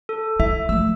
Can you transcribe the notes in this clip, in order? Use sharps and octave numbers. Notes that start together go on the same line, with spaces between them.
A4
E4 E5
F3 A3 E6